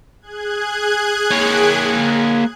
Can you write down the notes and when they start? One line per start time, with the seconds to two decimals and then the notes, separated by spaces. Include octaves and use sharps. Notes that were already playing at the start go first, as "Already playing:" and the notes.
0.22 G#4 F#6 G#6
1.31 A#3 C#5